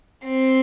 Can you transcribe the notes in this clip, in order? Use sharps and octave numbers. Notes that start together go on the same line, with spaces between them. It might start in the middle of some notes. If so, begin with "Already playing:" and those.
C4